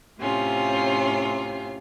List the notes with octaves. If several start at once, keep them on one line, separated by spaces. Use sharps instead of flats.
A2 C3 C#4 F4